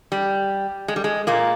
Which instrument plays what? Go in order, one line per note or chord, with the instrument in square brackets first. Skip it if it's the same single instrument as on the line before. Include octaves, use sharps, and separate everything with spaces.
[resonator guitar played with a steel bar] G3
G#3
G3
G#3
A#2 A#3